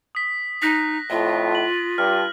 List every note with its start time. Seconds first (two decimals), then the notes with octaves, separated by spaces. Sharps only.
0.15 D#6 B6
0.62 D#4 F#6 A#6 B6
1.10 F2 A2 F4
1.55 F#7
1.98 G2 F6